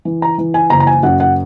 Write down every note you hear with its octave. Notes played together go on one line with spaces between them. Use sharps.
E3
A#5
E3
G#5
F#1 A#5
A#5
G#5
F#2 F#5
F#5